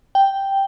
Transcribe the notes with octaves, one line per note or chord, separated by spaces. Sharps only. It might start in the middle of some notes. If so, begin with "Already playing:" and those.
G5